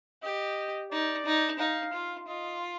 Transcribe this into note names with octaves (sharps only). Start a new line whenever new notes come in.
G4 D#5
D#4 D5
D#4
D#4 F5
F4
F4 D#5